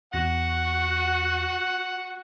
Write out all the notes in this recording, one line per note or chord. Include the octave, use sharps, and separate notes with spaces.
E2 F#4 F#5 A#6